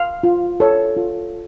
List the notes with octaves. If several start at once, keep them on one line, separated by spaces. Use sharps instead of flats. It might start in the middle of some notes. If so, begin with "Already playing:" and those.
Already playing: F5
F4
A4 C#5
F4